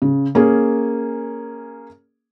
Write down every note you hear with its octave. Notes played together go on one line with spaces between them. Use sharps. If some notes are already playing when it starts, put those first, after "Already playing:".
C#3
A#3 C#4 G#4